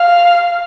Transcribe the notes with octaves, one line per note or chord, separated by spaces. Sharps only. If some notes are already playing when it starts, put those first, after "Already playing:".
Already playing: F5